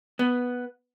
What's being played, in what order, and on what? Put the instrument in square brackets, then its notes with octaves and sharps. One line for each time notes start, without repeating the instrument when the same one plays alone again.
[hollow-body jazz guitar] B3